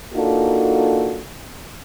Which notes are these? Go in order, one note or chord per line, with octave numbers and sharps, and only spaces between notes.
A#3 D4 D#4 F4 F#4 A4